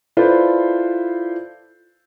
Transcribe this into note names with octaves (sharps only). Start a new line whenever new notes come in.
E4 F4 A4 B4 C5 D5